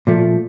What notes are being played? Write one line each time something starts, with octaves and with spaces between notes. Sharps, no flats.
A#2 F3 A3